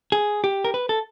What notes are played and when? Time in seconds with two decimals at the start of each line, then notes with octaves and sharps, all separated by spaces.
0.12 G#4
0.44 G4
0.64 A#4
0.74 B4
0.89 A4